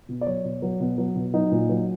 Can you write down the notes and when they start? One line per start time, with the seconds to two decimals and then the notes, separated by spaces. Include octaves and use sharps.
0.09 B2
0.21 D5
0.27 F#3 C#5
0.44 B2
0.62 F#3
0.80 B2
0.98 F#3
1.16 B2
1.34 F#3 D#4 D#5
1.51 A#2
1.69 F#3